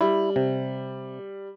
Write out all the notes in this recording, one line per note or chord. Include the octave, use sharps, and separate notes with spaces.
G3 E4
C3